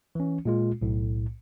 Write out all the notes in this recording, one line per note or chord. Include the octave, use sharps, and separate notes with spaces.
E3 C#4
A#2 G#3 F4
B1 A2